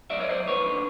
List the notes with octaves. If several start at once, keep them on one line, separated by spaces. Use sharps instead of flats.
F#3 D5 E5
C#5 D#5
F#3 C5 D5
D#2 B4 C#5
D3